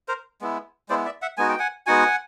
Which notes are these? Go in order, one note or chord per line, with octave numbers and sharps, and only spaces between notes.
A#4 C5
G#3 B3 E4
G#3 B3 E4 C5 D5
D5 E5
E5 F#5
G#3 B3 D#4 F#4 G#5
G5
F#5 G#5
G#3 B3 D#4 F#4 F#5 G#5